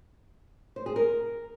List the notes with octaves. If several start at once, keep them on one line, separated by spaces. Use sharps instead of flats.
C5
G#4
A#4